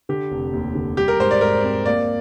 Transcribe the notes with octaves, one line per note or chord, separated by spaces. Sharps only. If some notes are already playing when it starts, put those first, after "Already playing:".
D3 G4
F1
D#2
D3
G3 G4
A#4
G#2 C5
D5
G#2 A#4
C4
A#3 D5